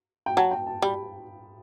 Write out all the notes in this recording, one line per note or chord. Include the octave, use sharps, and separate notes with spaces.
G5
F#3 A5
G5
A5
G3 B5